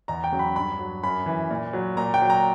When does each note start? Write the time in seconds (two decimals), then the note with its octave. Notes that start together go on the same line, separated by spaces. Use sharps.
0.08 E2 A#5
0.24 G5
0.32 C#3 F#3
0.39 B5
0.56 G2 B5
0.79 F#3
1.03 F#2 B5
1.26 E3
1.51 A#2
1.73 F#3
1.97 A#2 A#5
2.14 G5
2.21 F#3
2.30 A#5